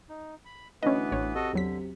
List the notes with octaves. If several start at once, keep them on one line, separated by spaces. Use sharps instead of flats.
D#4
B5
D2 E3 B3 C#4 B4 D#5
A1 C#5
C3 F#4 A4 D#5
E2 D3 F#3 B6